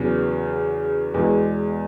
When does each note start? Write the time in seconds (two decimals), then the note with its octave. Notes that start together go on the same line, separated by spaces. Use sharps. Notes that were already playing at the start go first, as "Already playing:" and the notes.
Already playing: E2 C#3 F#3 B3
1.14 E2 B2 G#3